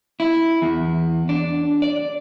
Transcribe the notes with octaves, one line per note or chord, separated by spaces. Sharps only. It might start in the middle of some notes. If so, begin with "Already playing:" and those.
E4
E2
D4
D5